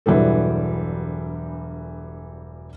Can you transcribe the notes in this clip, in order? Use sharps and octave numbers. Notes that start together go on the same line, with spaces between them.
E1 G2 E3 F#3 G3 A4